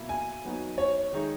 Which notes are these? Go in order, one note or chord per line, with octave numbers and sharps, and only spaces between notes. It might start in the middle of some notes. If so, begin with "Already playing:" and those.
Already playing: B2 A#3 E4
G#5
F#3 B3 D#4
C#5
D#3 G#3 D#4 G#4 D#5